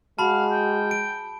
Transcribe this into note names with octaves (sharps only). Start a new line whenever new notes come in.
G#3 F#4 F5 A5 B5
G5
D7